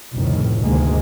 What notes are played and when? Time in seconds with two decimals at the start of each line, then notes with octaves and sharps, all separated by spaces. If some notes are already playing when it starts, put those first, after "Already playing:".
0.15 F1 C#2 A2 D#3
0.62 D2 G2 C3 D#3 G#3 A#3